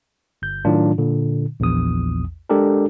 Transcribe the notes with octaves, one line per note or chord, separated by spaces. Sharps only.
G1 G6
A2 D#3 F#3 D4 F4
A#2 D3
A#1 E2 D#6
G#3 D4 G4 A4 A#4